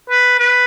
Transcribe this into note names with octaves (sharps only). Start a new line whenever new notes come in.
B4
B4